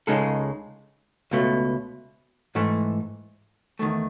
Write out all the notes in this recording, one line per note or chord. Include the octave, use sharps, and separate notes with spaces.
C#2 C#3 G#3 D#4 A4
C#2 B2 A3
G#2 E3 A3
E2 D#3 A3